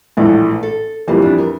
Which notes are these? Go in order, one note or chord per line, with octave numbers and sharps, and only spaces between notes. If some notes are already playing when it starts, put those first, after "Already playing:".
A#1 A2 E3 A3 A4
A4
F2 E3 G3 A#3
D4
A#4